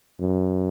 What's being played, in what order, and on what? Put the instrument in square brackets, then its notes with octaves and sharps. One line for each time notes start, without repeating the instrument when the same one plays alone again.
[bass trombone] F#2